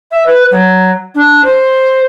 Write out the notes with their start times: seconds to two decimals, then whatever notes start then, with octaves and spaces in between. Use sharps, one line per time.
0.11 E5
0.26 B4
0.51 F#3
1.14 D4
1.44 C5